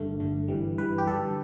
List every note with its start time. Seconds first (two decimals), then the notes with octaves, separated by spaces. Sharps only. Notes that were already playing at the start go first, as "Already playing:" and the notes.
Already playing: G1 G2 D3 A3
0.20 G1 G2 D3 A3
0.48 G2 E3 G3
0.78 G2 E3 G3 B4
0.98 G4
1.06 G2 D3 G3 A4